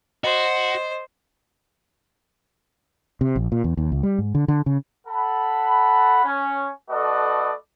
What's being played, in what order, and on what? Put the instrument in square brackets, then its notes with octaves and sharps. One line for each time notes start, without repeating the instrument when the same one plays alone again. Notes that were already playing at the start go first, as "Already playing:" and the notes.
[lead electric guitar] F#4 [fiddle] C5 [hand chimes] D#5
[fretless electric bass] C3
A#1
A#2
E2
D#2
C#2
G3
G#2
D3
D3
C#3
[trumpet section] A4 F#5 B5
C#4
A3 F#4 A4 B4 D5 D#5